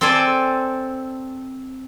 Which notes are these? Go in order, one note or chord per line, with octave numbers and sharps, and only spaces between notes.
C4 A4 C5 D5 G#5